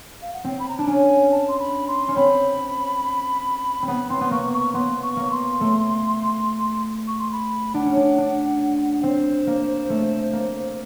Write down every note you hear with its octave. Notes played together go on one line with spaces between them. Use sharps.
F5
F#5
C4 G5
B5
A#5
D4 A5
C#4 G#5
A5
C6
B5
C6
C#4
C4 B5
C4
B3 B5
C4 C6
B3
A#3 C#6
C#6
B3 C6
C#6
A#3
C6
A3
C#6
C6
B5
D4 F#5
C#4
D4
D4
C4 C5
A#3
A3
A#3